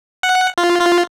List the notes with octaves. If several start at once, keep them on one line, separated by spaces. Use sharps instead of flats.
F#5
F4
F4